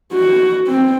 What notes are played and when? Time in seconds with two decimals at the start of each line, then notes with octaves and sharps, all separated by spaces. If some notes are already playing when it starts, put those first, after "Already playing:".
0.12 F#4
0.67 C4